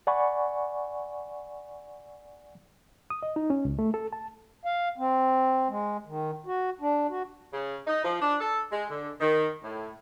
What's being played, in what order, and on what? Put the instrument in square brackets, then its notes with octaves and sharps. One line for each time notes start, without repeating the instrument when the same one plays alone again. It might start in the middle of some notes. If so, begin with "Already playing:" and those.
[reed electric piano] D5 F#5 G#5 B5 C#6
D#6
D#5
D#4
C#4
C#2
A3
A4
A5
[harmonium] F5
C4
G#3
D#3
F#4
D4
F#4
[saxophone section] C#3
D#4
F3
D4
A4
G#3
D3
D#3
A2